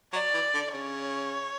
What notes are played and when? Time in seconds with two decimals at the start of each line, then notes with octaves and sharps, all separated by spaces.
0.13 F#3 D5
0.34 E3
0.54 D3
0.74 C#3 C#5